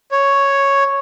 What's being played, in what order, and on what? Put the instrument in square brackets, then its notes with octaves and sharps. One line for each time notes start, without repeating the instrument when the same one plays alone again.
[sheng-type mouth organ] C#5